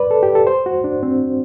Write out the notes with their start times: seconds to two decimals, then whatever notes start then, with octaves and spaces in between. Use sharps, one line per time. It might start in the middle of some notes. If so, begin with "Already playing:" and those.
Already playing: B4 D5
0.11 A4
0.23 G4
0.35 A4
0.47 C5
0.66 F#4
0.84 D4
1.03 C4